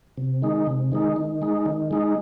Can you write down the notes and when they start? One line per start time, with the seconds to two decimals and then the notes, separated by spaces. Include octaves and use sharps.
0.17 C3
0.42 D#3 G#3 D#4
0.67 C3
0.92 D#3 G#3 D#4
1.16 D#3
1.42 G#3 D#4
1.66 D#3
1.91 G#3 D#4